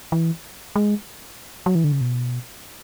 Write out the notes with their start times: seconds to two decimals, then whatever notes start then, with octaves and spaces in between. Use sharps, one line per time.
0.12 E3
0.76 G#3
1.66 F#3
1.75 E3
1.84 D3
1.92 C#3
2.01 B2